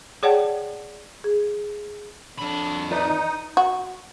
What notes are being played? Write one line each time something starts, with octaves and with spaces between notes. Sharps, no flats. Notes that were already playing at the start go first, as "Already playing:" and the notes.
G#4 C#5 D5 F#5 G5 A5
G#4
F2 D4 B5
D#4 B4 D5 E5 D#6
F#4